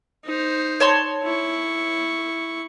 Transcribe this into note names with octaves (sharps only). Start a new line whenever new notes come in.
D#4 C5
C#5 A5 C6
E4 C#6